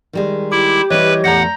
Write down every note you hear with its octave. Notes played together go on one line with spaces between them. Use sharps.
D#3 G3 G#3
E4 G4 D6
E3 G3 E4 B4 C#5 D#5
E2 A2 F#5 A#5 G6 A#6